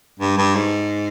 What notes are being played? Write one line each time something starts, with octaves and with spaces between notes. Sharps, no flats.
G2
G2
G#2